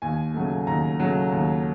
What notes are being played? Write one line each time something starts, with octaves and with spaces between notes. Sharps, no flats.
D#2 G#5
C#3 F#3 A3
D#2 A#5
C#3 F#3 A3
D#2